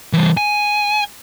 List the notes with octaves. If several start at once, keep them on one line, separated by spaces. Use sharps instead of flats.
E3 G3
G#5